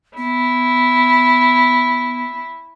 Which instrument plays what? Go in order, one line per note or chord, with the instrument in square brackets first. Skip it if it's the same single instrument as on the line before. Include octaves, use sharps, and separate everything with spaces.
[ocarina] B3 [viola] E4